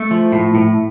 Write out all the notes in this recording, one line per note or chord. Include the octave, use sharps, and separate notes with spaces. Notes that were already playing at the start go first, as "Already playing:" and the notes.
Already playing: A3
F3
A2
A2